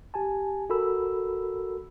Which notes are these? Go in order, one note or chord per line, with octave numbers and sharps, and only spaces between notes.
G4 G#5 A5
F#4 A4 A#4 B5 E6